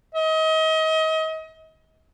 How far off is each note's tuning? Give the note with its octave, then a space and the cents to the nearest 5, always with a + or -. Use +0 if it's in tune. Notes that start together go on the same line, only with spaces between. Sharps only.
D#5 +35